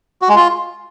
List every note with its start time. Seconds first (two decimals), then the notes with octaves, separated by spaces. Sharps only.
0.22 F#4
0.29 G#3
0.36 F4